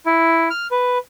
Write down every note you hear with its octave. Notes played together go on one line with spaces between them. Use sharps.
E4
F6
B4